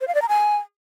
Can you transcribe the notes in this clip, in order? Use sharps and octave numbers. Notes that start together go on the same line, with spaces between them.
C5
F5
D5
A#5
G#5